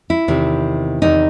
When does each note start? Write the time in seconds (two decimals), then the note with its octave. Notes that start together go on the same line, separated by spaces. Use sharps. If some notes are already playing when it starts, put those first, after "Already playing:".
0.10 E4
0.28 E2 C3 D#3
1.02 E2 C3 D#3 D#4